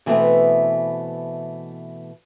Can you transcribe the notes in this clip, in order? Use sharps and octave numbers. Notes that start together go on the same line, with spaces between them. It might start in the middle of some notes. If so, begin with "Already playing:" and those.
B2 E3 G3 A3 B3 C4